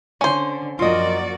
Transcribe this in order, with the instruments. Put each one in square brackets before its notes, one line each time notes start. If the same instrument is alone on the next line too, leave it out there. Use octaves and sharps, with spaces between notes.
[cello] D3 [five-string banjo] C#4 C5
[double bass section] F#2 F3 A#3 [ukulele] F4 D#5 [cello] F#4 D5